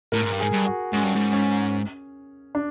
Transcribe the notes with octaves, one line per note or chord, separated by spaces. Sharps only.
A2 A#4
G#2
G2
G#2 G#4
G2
F#4
G#2 C#4
G2
G#2
C#4
D4